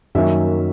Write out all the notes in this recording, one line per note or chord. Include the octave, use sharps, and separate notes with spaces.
F#2 D#3 F#3 A#3 C#4 E5